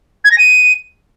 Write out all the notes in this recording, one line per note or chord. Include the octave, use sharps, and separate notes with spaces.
G#6
A#6
D#7